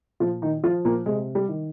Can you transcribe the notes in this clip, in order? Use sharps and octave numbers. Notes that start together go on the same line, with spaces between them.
A#2 F3 F4
D#3 D#4
F3 F4
A#2 A#3
C3 G#3
G3
D#3